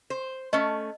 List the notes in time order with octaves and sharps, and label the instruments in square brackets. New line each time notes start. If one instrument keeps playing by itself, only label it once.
[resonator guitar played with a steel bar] C5
[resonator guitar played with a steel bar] A3 C#4 [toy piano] D#5